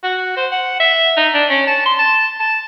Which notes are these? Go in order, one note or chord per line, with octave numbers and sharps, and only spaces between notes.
F#4
C5
F#5
E5
D#4
D4
C#4
A5
C6
A5
A5